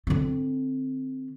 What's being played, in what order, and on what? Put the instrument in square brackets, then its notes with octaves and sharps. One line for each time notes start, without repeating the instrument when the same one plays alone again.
[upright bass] D3 C4